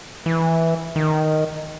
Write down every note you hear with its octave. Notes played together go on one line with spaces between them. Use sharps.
E3
D#3